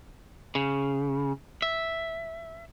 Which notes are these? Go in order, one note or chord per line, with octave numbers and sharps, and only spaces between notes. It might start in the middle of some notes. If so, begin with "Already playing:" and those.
C#3
E5